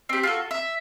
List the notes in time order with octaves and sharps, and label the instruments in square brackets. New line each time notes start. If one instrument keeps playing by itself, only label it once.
[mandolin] C4 G4
F4 F#4 A4
E5